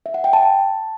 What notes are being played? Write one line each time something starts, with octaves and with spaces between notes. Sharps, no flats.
E5
F#5
G5
A5